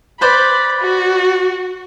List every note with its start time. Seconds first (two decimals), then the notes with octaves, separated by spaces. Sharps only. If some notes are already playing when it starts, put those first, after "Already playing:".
0.21 B4 C5 D5 B5
0.81 F#4